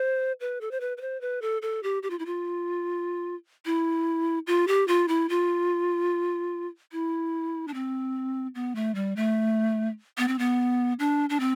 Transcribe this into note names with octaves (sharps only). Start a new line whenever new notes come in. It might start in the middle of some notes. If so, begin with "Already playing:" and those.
Already playing: C5
B4
A4
C5
B4
B4
C5
B4
A4
A4
G4
G4
F4
E4
F4
E4
F4
G4
F4
E4
F4
E4
D4
C4
B3
A3
G3
A3
B3
C4
B3
D4
D4
C4